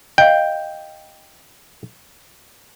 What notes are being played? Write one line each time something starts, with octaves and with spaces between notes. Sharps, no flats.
D#5 F5 G5